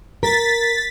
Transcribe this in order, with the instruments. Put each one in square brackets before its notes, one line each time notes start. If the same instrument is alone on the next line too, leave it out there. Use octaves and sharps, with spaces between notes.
[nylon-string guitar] A#4 [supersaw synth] A6 B6